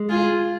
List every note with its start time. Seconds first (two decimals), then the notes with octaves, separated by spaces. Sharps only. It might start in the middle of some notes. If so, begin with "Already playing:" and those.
Already playing: G#3
0.09 F4 G#4